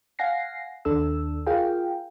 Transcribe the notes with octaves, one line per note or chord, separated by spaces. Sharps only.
F5 F#5 G#5 A#6 C7
D#2 D4 A4 E6
F4 G#4 A#4 F5 G5